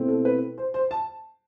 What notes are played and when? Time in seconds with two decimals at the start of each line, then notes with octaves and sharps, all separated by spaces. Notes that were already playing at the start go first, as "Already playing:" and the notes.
Already playing: B2 A3 C4 E4
0.08 A4
0.25 B4
0.58 C5
0.74 C5
0.91 A5